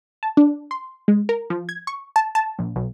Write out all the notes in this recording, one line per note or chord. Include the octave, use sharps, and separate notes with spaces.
A5
D4
C6
G#3
A#4
F3
G#6
C#6
A5
A5
A#1
B1